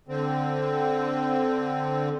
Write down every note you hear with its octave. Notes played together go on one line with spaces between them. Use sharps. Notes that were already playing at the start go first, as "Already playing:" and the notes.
D3 C4